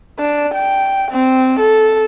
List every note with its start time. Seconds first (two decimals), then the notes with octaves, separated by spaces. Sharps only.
0.19 D4
0.54 G5
1.11 C4
1.60 A4